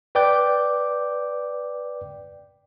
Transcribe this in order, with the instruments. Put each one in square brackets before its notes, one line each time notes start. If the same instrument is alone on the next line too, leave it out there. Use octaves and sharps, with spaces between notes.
[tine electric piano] B4 D5 G5 D6 G6